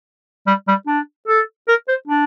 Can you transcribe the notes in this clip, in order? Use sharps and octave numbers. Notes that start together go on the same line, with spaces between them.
G3
G3
D4
A4
A#4
C5
D4